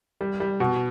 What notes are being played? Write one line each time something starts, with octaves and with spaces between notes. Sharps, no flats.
G3
G3
B2